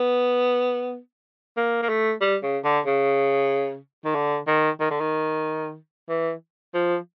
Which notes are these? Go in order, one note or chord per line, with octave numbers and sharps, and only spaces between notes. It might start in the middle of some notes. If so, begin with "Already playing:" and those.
Already playing: B3
A#3
A#3
A3
G3
C#3
D3
C#3
D#3
D3
D#3
D#3
D3
D#3
E3
F3